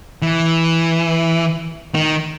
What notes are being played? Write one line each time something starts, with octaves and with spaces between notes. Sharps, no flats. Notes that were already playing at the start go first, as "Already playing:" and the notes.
E3
D#3